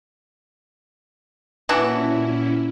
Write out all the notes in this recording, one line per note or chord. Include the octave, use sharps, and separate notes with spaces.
A#2 E3 C#4 D4 E4 F#4